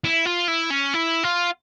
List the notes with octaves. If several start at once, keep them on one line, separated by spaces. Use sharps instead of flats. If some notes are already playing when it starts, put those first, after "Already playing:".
E4
F4
E4
C#4
E4
F4